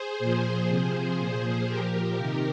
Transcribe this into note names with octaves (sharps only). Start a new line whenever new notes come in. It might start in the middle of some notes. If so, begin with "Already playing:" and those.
Already playing: G#4 C5
A#2 F3
C3 F3 G#4 C5
A#2 F3
A#2 F3 G4 A#4
C3 D#3